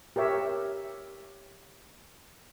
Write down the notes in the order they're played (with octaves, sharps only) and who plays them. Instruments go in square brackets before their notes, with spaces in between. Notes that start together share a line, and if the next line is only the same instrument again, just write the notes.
[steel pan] G4 A#4 C#5 E5